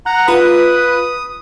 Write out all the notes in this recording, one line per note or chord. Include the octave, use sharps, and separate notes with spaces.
F#5 A#5 F#6
F4 B4 B5 D#6